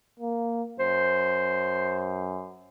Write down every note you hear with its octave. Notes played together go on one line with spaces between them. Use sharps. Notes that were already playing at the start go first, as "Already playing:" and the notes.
A#3
F#2 C5